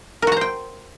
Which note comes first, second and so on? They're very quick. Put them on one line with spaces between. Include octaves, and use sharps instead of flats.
A#4 F#4 A#5 C5 G5